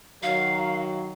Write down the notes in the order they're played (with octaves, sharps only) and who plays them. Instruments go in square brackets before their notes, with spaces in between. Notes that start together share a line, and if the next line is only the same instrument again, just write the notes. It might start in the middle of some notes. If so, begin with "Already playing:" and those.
[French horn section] D#3 F#3 [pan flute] F5